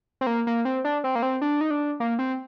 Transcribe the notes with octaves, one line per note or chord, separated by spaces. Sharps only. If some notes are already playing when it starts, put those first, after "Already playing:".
C4
A#3
A#3
C4
D4
C4
A#3
C4
D4
D#4
D4
A#3
C4